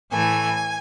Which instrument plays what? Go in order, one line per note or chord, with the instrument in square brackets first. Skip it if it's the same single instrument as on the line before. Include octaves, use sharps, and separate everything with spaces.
[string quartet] A2 E3 A3 G#5